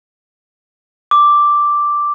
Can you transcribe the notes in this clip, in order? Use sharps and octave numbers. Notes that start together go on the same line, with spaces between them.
D6